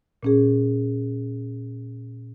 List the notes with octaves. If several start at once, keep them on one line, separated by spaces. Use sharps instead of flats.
A#2 C#4 G#4